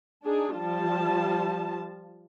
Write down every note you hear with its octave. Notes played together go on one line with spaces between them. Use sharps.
D4 D#4 G#4
F3 G3 F4 A5